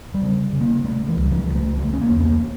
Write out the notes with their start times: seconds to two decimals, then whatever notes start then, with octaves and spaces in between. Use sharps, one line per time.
0.14 G3
0.22 C#3
0.53 C#3
0.60 A#3
0.84 C#3 A3
1.08 E3
1.16 C#2
1.21 G3
1.31 F3
1.47 C#3
1.55 A3
1.78 C#3 A3
1.93 C#4
2.01 A#3
2.09 E2
2.19 C#4
2.25 A#3